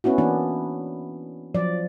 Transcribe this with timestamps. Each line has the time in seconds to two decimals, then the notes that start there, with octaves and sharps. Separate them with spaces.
0.04 B3 C#4 E4 F#4
0.18 E3 A#3 B3 D4
1.54 F3 F#3 D5